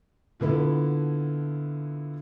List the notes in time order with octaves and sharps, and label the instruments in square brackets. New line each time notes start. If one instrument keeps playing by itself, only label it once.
[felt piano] A#2 D3 B3 E4 A4